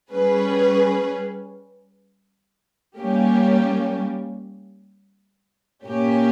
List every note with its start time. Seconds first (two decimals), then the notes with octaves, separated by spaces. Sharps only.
0.12 G3 C#4 G#4 B4
2.98 G3 A#3 C#4 G4
5.85 A#2 A#3 C#4 G4